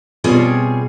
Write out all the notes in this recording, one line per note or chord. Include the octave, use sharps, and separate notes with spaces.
B2 G3 C4 F4 G#4 C#5